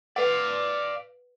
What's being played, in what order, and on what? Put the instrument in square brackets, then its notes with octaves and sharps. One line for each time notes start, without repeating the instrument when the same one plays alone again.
[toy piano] B4 F#5 [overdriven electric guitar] D5 F5